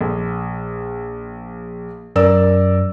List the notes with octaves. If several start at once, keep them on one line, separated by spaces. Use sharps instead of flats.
A#1
F#2 A#4 D5 E6